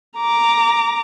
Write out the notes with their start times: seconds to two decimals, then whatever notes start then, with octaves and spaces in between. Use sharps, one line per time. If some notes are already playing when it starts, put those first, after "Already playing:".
0.17 A#5 D6